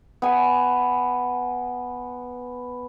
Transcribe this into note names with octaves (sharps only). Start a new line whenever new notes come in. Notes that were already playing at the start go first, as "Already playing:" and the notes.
B3 G#5